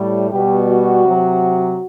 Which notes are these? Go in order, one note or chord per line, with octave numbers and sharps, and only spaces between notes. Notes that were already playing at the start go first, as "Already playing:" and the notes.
Already playing: A2 G3
B2 G3 G4
F#4
C3 F#3